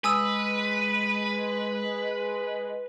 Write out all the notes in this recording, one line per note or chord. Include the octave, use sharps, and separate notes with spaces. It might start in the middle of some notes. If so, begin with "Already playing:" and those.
G#3 B4 G#5 D#6 E6